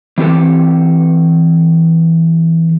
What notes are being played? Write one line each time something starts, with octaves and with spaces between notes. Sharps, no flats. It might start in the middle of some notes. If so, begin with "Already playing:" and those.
E3 C4 G4 A4